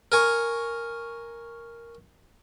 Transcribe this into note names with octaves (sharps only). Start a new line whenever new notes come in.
A#4 G#5 C#6